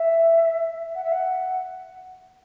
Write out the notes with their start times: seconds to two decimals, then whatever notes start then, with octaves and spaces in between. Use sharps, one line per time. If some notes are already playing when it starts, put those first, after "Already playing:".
Already playing: E5
0.95 F#5
1.04 E5
1.12 F#5